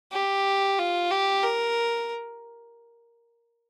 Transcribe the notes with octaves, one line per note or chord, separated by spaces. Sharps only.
G4
F4
G4
A#4